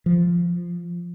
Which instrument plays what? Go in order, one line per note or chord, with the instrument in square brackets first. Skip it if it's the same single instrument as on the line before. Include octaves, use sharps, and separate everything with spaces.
[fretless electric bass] F3